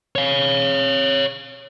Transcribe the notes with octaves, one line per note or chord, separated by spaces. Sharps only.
C#5 F5